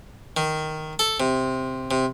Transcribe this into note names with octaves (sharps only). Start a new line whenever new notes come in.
D#3
A4
C3
C3